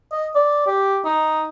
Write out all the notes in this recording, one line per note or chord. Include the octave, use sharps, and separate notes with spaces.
D#5
D5
G4
D#4